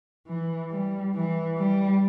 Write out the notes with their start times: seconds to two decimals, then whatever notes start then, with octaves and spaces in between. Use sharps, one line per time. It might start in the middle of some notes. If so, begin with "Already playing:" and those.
0.27 E3
0.71 G3
1.15 E3
1.59 G3